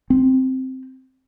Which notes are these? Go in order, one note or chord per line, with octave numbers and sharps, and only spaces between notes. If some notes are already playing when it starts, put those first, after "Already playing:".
C4